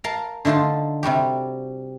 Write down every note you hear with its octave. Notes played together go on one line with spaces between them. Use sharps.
A#4 F5 A5 A#5
D3 A3 D#4 F4 A5
C3 G3 F#4 G4